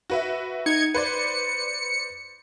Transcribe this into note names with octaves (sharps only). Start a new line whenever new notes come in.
F#4 B4 E5
D#4 G#6 C#7
B4 C5 D5 C#7